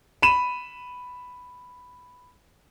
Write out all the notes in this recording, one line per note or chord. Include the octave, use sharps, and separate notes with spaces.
B5 D#7 E7